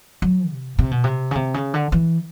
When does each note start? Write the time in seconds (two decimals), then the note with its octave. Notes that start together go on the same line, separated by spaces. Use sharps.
0.22 F#3
0.50 C3
0.79 C3
0.91 B2
1.04 C3
1.31 C#3
1.35 C3
1.54 C#3
1.74 D3
1.92 E3